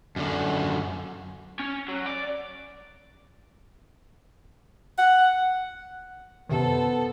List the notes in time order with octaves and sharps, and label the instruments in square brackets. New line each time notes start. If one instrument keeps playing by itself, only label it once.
[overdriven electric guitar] F#2 D3
C#4
F#3
D5
[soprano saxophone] F#5
[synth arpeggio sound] F#2 C3 D#3 [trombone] B3 [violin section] A4 C5